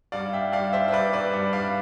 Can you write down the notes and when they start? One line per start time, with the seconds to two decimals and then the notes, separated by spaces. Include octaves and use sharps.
0.12 G2 D5 F5
0.33 E5 G5
0.52 G2 D5 F5
0.73 C5 E5
0.88 E5
0.92 G2 B4 D5
1.13 B4 D5
1.34 G2
1.53 D5 F5